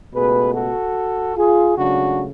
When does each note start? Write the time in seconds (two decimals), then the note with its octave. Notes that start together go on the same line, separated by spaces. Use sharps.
0.13 C#2 B2 A3 G#4 B4
0.54 F#4 A4
1.37 F4 G#4
1.77 C#2 C#3 F#3 A3 D4 F#4